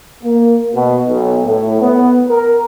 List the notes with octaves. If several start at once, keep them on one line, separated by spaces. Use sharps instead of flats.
A#3
B2
B1
A2
B3
A#4